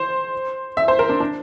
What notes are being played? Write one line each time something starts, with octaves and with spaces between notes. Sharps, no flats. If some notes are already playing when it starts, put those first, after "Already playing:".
Already playing: C5
E5
C5
A#4
D4
D4